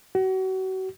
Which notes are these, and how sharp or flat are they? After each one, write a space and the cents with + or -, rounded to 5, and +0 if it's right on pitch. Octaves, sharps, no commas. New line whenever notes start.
F#4 +35